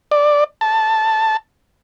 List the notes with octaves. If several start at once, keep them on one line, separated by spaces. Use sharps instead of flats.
D5
A5